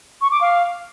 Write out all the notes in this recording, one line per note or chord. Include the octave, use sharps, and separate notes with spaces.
C#6
D6
F5